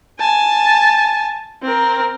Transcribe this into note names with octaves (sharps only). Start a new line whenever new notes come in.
G#5 A5
C4 A#4